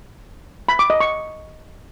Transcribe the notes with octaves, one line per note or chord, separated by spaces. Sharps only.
B5
D6
D#5
C#6